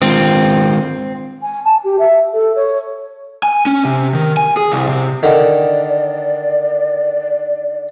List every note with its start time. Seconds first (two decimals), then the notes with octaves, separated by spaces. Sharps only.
0.02 D#3 G#3 C4 F4
1.42 G#5
1.65 A5
1.84 G4
1.99 E5
2.33 A4
2.55 C#5
3.43 G#5
3.66 C#4
3.85 C3
4.14 D#3
4.37 G#5
4.57 G#4
4.72 C2
4.89 C3
5.23 D3 D#3 D5